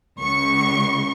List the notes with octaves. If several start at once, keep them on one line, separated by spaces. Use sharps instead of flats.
C#2 C#6